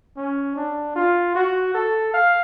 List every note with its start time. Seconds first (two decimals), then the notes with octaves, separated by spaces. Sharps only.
0.17 C#4
0.56 D4
0.95 F4
1.35 F#4
1.74 A4
2.14 F5